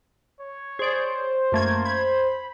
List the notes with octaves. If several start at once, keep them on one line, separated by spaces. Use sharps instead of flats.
C#5
G#4 C5 D5
F#2 A3 A#3 G#6
B5 G#6